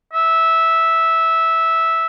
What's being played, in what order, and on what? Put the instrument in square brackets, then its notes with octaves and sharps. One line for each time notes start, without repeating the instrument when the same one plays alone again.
[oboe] E5